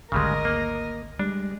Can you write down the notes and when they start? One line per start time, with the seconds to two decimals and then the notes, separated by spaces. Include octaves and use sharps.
0.12 G#1 D2 C#3 G3 G#3 A#4 D#5
0.45 A#3
1.19 G3 G#3 D4